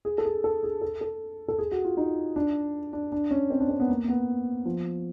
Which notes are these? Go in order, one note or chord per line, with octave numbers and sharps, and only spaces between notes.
G#4
A4
G#4
A4
G#4
A4
A4
A4
G#4
F#4
F4
D#4
D4
D4
D4
C#4
C4
D4
C4
B3
A#3
B3
F3